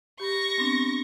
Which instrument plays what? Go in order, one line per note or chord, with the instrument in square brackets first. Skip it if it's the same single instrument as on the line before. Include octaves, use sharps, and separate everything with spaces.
[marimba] G4 B5 [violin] C#6 A#6
[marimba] B3 C4 D4